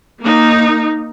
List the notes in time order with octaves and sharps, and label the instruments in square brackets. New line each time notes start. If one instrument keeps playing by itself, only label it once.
[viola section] A#3 D#4